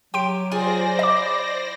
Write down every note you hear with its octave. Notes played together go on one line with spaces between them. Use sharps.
F#3 G4 G5 C6 D7
F4 G#4 C5 D5 G#5 A#6
E4 D#5 D6